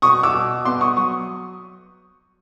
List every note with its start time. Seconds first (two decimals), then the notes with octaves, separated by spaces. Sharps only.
0.02 B2 C#6 D#6
0.23 D6 E6
0.34 B2
0.65 B3 C6 D6
0.81 C#6 D#6
0.97 F#3 C#6 D#6